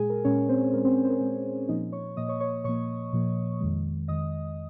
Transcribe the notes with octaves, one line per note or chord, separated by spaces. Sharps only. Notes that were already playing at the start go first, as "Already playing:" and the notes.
Already playing: A#2 G#3 G#4 G#5
A#4
A#2 G#3 C#4 C#5
C4 C5
A#2 G#3 A#4
C4 C5
C5
A#4
A#2 G#3 C4 C5
A#2 F3 A#3 D#4 D#5
C#5 C#6
A#2 F3 A#3 D#5 D#6
C#5 C#6
C#5 C#6
A#2 F3 A#3 C#5 C#6
A#2 F3 A#3
F2 D#3 G#3
F2 D#3 G#3 D#5 D#6